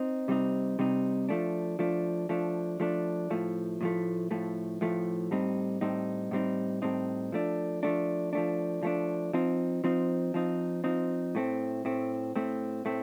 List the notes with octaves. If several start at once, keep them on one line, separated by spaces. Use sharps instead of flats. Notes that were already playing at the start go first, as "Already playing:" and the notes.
Already playing: C4 D#4
C3 G3 C4 D#4
C3 G3 C4 D#4
F3 A3 D4
F3 A3 D4
F3 A3 D4
F3 A3 D4
A2 F3 A3
A2 F3 A3
A2 F3 A3
A2 F3 A3
A2 G3 C4 D#4
A2 G3 C4 D#4
A2 G3 C4 D#4
A2 G3 C4 D#4
F3 A3 D4
F3 A3 D4
F3 A3 D4
F3 A3 D4
F3 C4 D#4
F3 C4 D#4
F3 C4 D#4
F3 C4 D#4
A2 A3 C4
A2 A3 C4
A2 A3 C4
A2 A3 C4